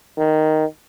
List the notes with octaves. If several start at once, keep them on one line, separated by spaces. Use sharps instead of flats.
D#3